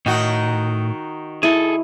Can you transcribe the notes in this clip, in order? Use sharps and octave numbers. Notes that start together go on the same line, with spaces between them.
A2 D#3 D#4 F#4
E4 G#4 A4